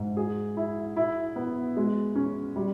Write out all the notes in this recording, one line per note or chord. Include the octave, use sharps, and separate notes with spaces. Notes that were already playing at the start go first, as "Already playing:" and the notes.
Already playing: G#2
G#4
E4
E4
B3
G#3
C#4
G3